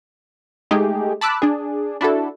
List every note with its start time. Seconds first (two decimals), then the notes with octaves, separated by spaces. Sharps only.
0.71 G#3 A3 D#4 G4 G#4
1.21 A5 B5 D6 E6 F#6
1.42 D4 G#4
2.01 D4 E4 F#4 A4